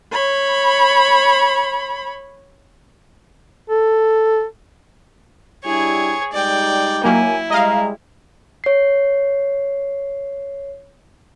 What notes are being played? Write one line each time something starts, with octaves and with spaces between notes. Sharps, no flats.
C#5 B5
A4
G3 D4 E4 G#4 C#5
G3 G#3 D#4 D5 G5
F#3 A#3 E4 G#5
G3 G#3 D#5 F5 A#5
C#5 C7